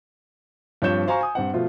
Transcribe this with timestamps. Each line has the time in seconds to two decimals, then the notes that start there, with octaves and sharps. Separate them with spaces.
0.82 G2 F3 C4 C#5 G6 E7
1.07 F#4 C5 F5 G#5 A#5 C#6
1.21 G#5 D#6
1.35 G2 C4 F#5
1.53 B2 F3 A3 F4